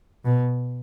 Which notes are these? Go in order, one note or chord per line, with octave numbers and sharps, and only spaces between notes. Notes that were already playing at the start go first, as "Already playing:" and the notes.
B2